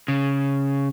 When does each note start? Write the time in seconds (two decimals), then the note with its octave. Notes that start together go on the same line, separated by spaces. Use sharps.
0.08 C#3